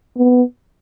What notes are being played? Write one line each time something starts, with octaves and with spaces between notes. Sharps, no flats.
B3